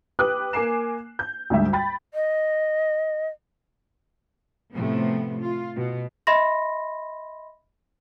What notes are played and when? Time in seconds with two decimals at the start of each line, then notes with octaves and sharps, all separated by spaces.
0.19 G4 B4 D6 D#6 F#6
0.53 A#3 G#5 D6 C7 E7
1.19 G6
1.50 D2 G#2 D3 G3 E5
1.73 G5 B5 A6
2.14 D#5
4.72 A2 C3 F3 A3 B3
5.41 F4
5.76 B2
6.27 D#5 E5 B5 C6 A#6